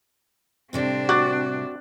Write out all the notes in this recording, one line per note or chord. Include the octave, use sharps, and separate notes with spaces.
A2 C3 G3 C4 D4
F#4 D6 F#6 A6